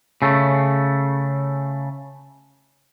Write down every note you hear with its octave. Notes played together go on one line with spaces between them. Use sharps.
C#3 A3